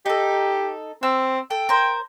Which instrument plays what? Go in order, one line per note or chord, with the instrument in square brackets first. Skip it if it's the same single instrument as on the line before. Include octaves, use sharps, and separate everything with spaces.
[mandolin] D#4 A4 [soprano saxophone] G4
[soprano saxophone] C4 [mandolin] E6
[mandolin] A4 [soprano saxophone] G5
[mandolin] A#4 C5